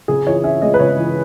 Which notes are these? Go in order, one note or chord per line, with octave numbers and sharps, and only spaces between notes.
C#3 G#4
E3 C#5
C#4 E5
G#3 D#5
B4
C#3 C#5
E3